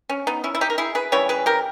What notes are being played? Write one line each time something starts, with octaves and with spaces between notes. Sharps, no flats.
C#4
B3 D#4
C#4 E4
E4
D#4 G4
A#4
E4 G#4
G#4 B4
C#3 E3 G3 C#5
G#4 B4
G4 A#4